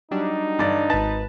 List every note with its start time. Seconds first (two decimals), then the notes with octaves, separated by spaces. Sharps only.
0.11 F#3 G3 D4 D#4
0.59 G2 D3 D5 A6
0.90 G#1 B4 A5 A6